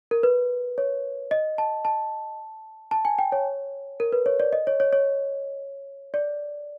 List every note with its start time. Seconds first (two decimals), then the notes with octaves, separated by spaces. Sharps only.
0.11 A#4
0.23 B4
0.78 C#5
1.31 D#5
1.58 A5
1.85 A5
2.91 A5
3.05 G#5
3.19 G5
3.32 C#5
4.00 A#4
4.12 B4
4.26 C#5
4.40 D5
4.53 D#5
4.67 C#5
4.80 C#5
4.93 C#5
6.14 D5